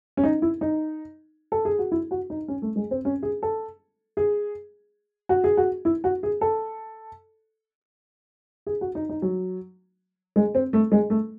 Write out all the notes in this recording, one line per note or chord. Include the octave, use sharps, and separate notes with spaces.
C#4
D#4
E4
D#4
A4
G#4
F#4
E4
F#4
D#4
C#4
A3
G#3
C4
C#4
G#4
A4
G#4
F#4
G#4
F#4
E4
F#4
G#4
A4
G#4
F#4
D#4
D#4
F#3
G#3
C4
A3
G#3
A3